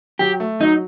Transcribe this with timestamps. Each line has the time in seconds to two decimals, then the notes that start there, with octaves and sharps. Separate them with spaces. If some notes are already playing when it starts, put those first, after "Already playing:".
0.19 F#3 G4
0.40 A3
0.60 F#3 D#4